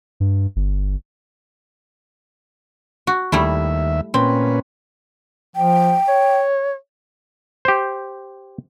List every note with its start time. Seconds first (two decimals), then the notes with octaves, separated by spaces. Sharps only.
0.20 G2
0.56 G1
3.07 F#4
3.32 D#2 G3 A3 E4 E5
4.14 A#2 C4 C#4 B4
5.56 F3 G5
6.08 C#5
7.65 G4 C5